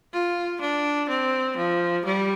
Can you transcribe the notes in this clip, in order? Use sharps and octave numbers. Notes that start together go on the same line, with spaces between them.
F4
D4
C4
F3
G3